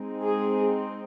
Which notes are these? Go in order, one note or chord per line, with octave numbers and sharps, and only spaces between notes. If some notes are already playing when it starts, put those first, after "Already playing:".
Already playing: G#3 C4 D#4
G#4